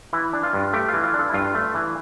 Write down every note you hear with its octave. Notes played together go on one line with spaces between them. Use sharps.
E3 E4
D4
F4
G2
A3 G4
F4
E3
F4
D4 A4
E4
G2 F4
A3
E3